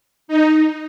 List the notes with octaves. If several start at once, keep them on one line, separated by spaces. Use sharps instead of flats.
D#4